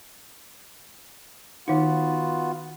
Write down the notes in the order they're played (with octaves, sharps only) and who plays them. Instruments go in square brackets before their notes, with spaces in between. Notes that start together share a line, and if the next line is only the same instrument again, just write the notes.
[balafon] D#3 D#4 [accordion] B3 F4 F#4